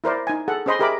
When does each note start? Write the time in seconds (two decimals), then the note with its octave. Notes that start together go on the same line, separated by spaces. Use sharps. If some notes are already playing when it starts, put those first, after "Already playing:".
0.04 E4 A#4 C5 D5
0.27 D#4 G#5
0.48 G#4 A4 F#5
0.66 C#4 G#4 C5 D#5 B5 C6
0.79 G4 G#4 A#4 E5 B5 D6